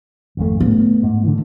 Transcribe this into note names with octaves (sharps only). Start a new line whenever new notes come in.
G#1 F2 A3
A2 B3
G#2
D3 E3